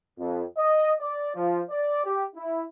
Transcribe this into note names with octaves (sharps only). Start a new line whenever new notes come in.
F2
D#5
D5
F3
D5
G4
E4